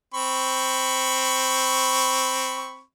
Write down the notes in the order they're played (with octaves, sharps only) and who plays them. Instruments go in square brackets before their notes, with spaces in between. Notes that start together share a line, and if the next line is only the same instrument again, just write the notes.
[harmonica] C4 B5 C#6